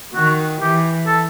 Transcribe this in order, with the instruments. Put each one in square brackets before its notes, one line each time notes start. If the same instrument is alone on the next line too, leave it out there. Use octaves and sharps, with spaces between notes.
[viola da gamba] D#3 [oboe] F#4
[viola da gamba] E3 [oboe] G4
[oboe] A4